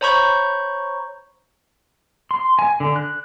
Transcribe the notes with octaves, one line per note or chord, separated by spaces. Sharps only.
C5 C#5 A#5 B5 C#6 G6
C6
G#5
D3
F#6